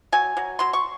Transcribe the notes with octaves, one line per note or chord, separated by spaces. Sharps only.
F#3 G#5
F#3
F#3 C6
C#6